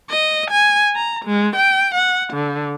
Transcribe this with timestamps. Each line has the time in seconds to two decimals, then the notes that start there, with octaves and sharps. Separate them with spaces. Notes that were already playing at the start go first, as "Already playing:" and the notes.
0.10 D#5
0.51 G#5
0.95 A#5
1.25 G#3
1.56 G5
1.95 F#5
2.33 D3